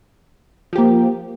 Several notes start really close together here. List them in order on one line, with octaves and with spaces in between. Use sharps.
F3 G4 A#3